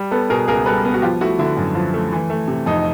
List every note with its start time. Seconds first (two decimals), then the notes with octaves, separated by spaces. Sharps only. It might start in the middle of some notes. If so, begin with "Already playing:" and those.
Already playing: G3
0.11 B3 A4 B4
0.30 B2 G#4 A#4
0.48 C#2 G#4 A#4
0.66 G3 A4 B4
0.85 B3
0.94 F#4
1.02 F3 F4 G4
1.21 A3 E4 F#4
1.39 D3 E4
1.57 F#2
1.75 F3
1.94 A3
2.12 E3
2.30 A3
2.48 C3
2.66 F2 D#4